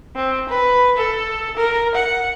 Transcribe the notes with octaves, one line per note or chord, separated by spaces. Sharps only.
C4
B4
A4
A#4
F#5